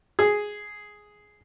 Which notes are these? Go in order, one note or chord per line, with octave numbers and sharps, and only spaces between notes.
G#4